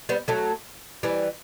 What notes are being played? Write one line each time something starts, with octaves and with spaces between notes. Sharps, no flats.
G3 B3
F#3 A3
E3 G3